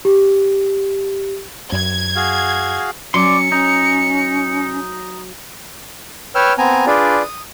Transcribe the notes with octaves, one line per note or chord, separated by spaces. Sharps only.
G4
F#2 G#6
F#4 G#4 F5
F#3 C#4 D5 C6 C#7
C#4 D#4
B4 C#5 G5 E6 F6
B3 C4 G#5 A#5
D4 F4 G#4 B4 D5
D#6